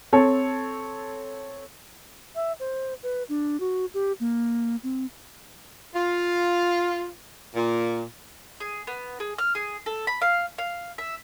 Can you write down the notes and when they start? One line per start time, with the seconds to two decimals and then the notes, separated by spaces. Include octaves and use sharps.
0.13 C4 A4 C#5 A5
2.35 E5
2.60 C5
3.03 B4
3.29 D4
3.60 F#4
3.94 G4
4.20 A#3
4.83 C4
5.95 F4
7.55 A#2
8.60 G#4
8.87 B3
9.20 G#4
9.38 F6
9.55 G#4
9.86 A4
10.07 B5
10.22 F5
10.58 F5
10.98 E5